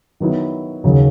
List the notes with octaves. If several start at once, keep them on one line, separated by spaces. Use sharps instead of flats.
D#3 F#3 B3 E4
D#2 C#3 F#3